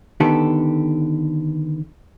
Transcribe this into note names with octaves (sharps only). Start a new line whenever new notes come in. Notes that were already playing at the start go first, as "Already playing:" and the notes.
D3 D#3 B3 G4 A4